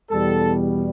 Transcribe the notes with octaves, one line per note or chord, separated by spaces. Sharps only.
E2 B2 G3 A4